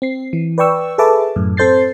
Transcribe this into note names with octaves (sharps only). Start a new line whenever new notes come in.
C4 C7
E3
B4 D5 G5 C#6 E6
G#4 A4 B4 E5 A5 D6
F#2 A2
C4 A4 C5 G6 A6 C7